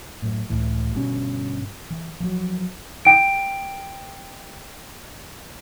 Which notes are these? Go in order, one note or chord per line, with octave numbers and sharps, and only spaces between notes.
F#2 A2
C#2 A2 E3
G1 G2 B2 C#4
E3
F3 F#3
G5 D7